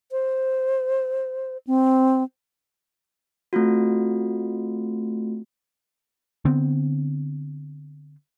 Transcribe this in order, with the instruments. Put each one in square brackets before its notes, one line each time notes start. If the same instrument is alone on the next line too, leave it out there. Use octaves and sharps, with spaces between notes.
[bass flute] C5
C4
[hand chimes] A3 C4 F4 F#4
[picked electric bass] D3 B3 C4